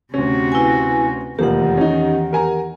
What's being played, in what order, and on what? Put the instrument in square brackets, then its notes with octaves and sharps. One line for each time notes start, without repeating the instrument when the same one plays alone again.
[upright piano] D2 C#4 [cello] C3 F#4
[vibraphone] E4 B4 G#5
[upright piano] F1 F3 A#3 [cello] E2 D#3 [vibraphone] G4 F#5
[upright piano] C#4 D#4
A#4 G#5 A#5